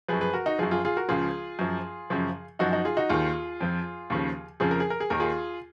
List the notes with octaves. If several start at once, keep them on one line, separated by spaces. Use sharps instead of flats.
F#2 F3 G#4 B4
G#4 B4
F#4 A#4
D#4 F#4
F#2 F3 F4 G#4
F4 G#4
F4 G#4
F#4 A#4
C#2 C#3 F3 F4 G#4
F#2 F3
F#2 C#3 F3
F#2 F3 D#4 F#4
D#4 F#4
F4 G#4
D#4 F#4
D#2 D#3 F4 G#4
F2 F3
D#2 C#3 F3
F2 C#3 F3 G#4
A#4
G#4
A#4
G#4
D#2 D#3 A#4
F4 G#4